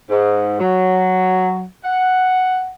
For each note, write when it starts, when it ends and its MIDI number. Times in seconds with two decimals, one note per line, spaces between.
0.10 0.58 44
0.60 1.64 54
1.83 2.69 78